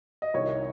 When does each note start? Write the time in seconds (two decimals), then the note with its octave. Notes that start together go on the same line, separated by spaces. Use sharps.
0.22 D#5
0.34 C2 C3 D#3 C#5